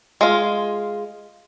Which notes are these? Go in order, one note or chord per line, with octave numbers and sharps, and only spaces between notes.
G#3 F4